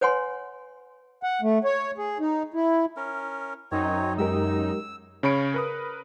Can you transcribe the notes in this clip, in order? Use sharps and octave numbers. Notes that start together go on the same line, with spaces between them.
B4 C#5 F#5 G#5 C6
F#5
A3
C#5
G#4
D#4
E4
C#4 A#4
F#2 C4 D#4 C#5
G#3 G4 A#4 E6
C#3 C#4 C#5 B5 C#7 D7
A#4 B4 D#6